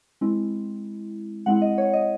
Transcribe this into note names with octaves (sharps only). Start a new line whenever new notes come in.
G#3 C4 E4
G#3 C4 E4 F#5
D#5
C#5
D#5